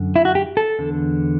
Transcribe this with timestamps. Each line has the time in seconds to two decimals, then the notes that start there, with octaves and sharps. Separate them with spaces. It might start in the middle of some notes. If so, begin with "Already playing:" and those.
Already playing: F#2 D3
0.16 E4
0.25 F#4
0.35 G4
0.57 A4
0.79 E2 D3